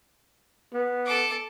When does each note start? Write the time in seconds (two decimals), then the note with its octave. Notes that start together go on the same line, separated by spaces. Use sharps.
0.73 B3
1.06 A4 D6